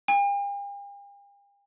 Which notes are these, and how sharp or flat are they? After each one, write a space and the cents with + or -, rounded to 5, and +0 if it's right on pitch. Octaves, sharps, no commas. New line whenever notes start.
G5 +45